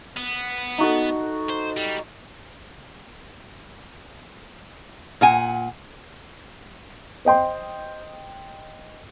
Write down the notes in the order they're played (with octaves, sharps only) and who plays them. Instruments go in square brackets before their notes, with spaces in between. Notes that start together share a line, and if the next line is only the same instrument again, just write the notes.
[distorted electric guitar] B3
[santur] D#4 F#4 A4
[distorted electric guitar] C5
G3
[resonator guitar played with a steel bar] A#2 F#5 G#5
[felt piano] C5 D#5 G5 C6